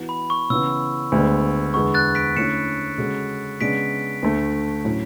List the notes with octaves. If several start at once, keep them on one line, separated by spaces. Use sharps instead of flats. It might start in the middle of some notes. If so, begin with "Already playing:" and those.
Already playing: E3 B3 F#4
B5
C#6
C#3 E3 B3 E4 E6
D2 D3 G#3 B3 D4
E2 D3 G#3 B3 C#6
F#6 A6
B6 D7
D3 A3 C#4 E4 C#7 E7
C#3 G#3 C#4 F#4 A4
C#3 G#3 B3 D4 B6 D7
D2 D3 A3
A2 F#3 C#4